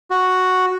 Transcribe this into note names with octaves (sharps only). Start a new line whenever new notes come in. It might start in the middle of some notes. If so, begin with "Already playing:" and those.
F#4